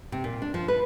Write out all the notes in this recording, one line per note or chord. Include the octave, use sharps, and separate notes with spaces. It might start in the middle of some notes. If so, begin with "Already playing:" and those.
C3
A#2
D4
F3
B4